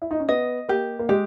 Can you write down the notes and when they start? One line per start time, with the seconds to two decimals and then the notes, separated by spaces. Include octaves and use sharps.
0.02 E4
0.11 D#4
0.20 C#4
0.29 B3 D#5
0.69 A#3 G4
0.99 A#3
1.09 G#3 G4